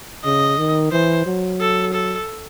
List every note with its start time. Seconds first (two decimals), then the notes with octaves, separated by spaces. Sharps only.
0.24 C#3 D#5
0.58 D#3
0.92 E3 C5
1.26 F#3
1.61 A4
1.94 A4